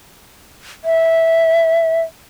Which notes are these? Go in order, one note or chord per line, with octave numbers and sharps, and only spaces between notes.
E5